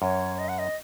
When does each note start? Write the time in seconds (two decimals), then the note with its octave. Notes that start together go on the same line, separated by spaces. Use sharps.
0.02 F#2 C#5
0.39 D#5
0.49 F#5
0.59 D#5